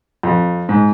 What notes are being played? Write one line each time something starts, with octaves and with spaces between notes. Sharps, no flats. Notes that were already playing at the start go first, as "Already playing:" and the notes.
F2
G#2